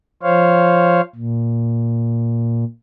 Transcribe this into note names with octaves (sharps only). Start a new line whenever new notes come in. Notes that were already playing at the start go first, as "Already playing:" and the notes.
F3 C5 C#5 F5
A#2